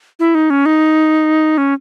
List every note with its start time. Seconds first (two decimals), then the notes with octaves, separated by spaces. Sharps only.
0.20 E4
0.35 D#4
0.50 C#4
0.66 D#4
1.58 C#4